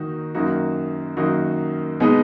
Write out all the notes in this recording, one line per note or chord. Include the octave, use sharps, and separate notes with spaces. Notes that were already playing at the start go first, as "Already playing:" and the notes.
Already playing: D#3 A#3 D#4 F#4
F#2 D#3 A#3 D#4 F#4
F#2 D#3 A#3 D#4 F#4
B2 G#3 B3 D#4